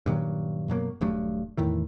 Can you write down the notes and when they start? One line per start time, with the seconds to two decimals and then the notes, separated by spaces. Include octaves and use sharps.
0.06 G2 A#2 D#3 F#3
0.68 F#2 B2 F#3 A#3
1.01 D#1 G2 F#3 A3
1.57 E2 A2 D#3 E3